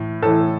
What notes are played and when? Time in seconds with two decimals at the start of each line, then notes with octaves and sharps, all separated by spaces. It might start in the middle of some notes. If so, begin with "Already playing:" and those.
Already playing: A2 E3
0.22 A2 E3 A4